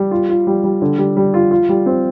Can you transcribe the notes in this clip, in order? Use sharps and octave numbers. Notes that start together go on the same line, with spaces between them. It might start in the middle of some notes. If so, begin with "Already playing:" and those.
Already playing: G3
F4
F4
G3
G3
D3
G3
G3
F4
F4
G3
C4